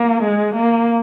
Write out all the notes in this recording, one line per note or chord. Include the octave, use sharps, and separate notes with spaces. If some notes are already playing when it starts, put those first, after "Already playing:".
Already playing: A#3
G#3
A#3